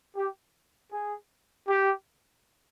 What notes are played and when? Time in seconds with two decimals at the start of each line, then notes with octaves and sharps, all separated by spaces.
0.15 G4
0.91 G#4
1.67 G4